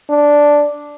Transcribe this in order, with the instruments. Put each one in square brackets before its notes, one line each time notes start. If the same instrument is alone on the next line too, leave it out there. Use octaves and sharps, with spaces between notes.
[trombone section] D4